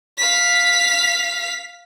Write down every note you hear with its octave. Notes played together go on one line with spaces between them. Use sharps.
F5 B6